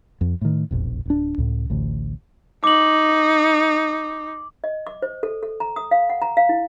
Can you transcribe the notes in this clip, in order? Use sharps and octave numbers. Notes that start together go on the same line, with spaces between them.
F2
A2 D#3
E1 A#1 F2
D1 D4
C#2 A2
A1 D2
D#4 D6 F#7
D#5
D6
C5
A4
A4
A#5
D#6
F5
F#5
A#5
F5
E4